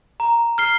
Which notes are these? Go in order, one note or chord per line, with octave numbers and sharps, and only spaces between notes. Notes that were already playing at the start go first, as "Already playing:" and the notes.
A#5
F6 C7 G7